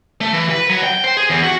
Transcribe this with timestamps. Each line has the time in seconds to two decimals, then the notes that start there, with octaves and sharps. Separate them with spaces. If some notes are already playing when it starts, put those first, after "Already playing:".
0.21 A3
0.33 E3
0.50 B4
0.70 F#3
0.84 G5
1.04 C5
1.17 G#4
1.30 E2
1.44 F#4